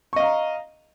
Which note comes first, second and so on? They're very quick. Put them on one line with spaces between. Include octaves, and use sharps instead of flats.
C#6 D#5 F5 A#5